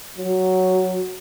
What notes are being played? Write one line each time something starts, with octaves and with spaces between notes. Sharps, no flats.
F#3